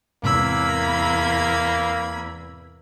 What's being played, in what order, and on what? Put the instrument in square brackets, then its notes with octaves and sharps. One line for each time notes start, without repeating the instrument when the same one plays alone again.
[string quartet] E2 B5 G#6 [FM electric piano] G#2 C3 E6 [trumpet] A#3